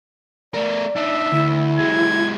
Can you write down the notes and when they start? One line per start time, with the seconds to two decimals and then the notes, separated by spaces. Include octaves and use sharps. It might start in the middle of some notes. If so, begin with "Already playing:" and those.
0.54 A3 A#4 D5
0.96 D4 D#4 E5
1.32 D2 E4
1.79 F#3 G#3 G#6